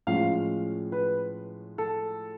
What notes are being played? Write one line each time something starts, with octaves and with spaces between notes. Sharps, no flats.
A2 F3 G#3 C#4 F5
B4
A4